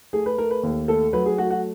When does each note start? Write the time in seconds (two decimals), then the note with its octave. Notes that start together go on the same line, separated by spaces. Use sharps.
0.13 A3 G#4
0.26 B4
0.38 A3 A#4
0.51 B4
0.63 D#2
0.88 A3 A4
1.13 F#3 B4
1.26 G#4
1.38 A3 F#4
1.50 F#4